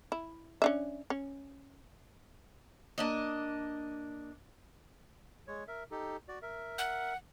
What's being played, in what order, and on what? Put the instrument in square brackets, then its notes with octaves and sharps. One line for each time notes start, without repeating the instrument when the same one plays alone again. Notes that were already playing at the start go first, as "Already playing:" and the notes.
[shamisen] E4
C#4 D4 E5
C#4
[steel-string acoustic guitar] A#3 D4 D#5
[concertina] G#3 C#5
A#4 E5
D#4 G4 A4
F#4 D5
A#4 E5
[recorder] F#5